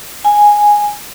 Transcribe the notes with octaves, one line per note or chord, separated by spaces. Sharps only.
G#5